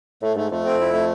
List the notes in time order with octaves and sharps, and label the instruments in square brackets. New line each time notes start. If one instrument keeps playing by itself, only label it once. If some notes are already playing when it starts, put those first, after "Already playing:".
[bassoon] A2 [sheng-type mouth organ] A3
[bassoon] G#2 [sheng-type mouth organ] A3
[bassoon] F2 [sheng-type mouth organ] A3
[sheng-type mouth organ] C4
E4
A3